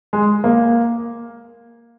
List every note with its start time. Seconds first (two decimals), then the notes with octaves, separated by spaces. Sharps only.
0.13 G#3
0.44 A#3